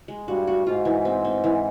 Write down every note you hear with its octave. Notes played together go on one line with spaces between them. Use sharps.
G#3
G2 F#4
F#4
G#2 F4
E3
C4
C4
E3